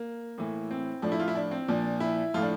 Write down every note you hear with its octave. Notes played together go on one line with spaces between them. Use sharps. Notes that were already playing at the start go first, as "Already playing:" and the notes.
Already playing: A#3
A2 E3
C4
A2 F3 D4
E4
F4
E4
D4
C4
A#2 F3 D4
E4
A2 F3 F4
D4